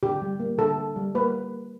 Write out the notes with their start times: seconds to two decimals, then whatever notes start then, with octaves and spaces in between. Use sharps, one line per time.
0.03 D3 G4
0.22 G3
0.40 A#3
0.58 D3 A4
0.78 D3
0.96 G3
1.15 A#3 B4